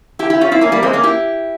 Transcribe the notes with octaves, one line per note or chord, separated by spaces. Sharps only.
E4 G4
E4 G4
C#4 F4
C4 E4
A#3 C#4
G3 A#3
G#3 C4
A#3 C#4
E4 G4